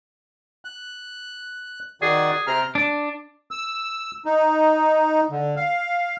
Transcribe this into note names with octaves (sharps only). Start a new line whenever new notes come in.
F#6
D#3 F#4 G#4 D5
C3 A#5 F6
D4
E6
D#4
D3
F5